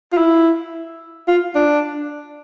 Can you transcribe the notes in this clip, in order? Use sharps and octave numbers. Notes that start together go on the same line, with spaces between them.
F4
E4
F4
D4